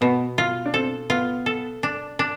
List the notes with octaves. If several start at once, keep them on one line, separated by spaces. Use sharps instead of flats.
B2 B3
F4
D4
C4 A4
B3 F4
A4
D4
D4